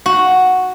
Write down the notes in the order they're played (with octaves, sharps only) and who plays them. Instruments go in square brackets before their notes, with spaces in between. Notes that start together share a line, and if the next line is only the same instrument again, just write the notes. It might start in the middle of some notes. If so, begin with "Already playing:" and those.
[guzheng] F#4